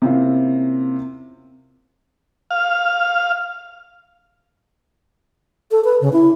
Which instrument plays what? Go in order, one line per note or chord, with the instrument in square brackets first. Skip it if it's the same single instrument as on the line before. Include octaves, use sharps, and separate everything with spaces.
[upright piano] C3 A#3 C4 C#4 E4 F4
[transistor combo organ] F5
[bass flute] A4
B4
C#3
E4